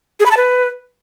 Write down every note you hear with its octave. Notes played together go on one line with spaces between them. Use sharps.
G#4
B5
A5
B4